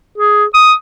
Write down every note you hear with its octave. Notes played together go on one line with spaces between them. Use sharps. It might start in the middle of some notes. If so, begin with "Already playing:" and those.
G#4
D#6